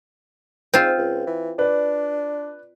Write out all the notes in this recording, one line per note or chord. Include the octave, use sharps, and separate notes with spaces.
G#2 C4 F4
C#2
E3
D4 B4 D5